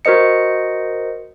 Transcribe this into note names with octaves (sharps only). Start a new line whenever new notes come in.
F#4 A#4 C5 D#5 C#7